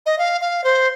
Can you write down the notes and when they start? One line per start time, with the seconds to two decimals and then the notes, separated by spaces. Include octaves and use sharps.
0.06 D#5
0.19 F5
0.41 F5
0.64 C5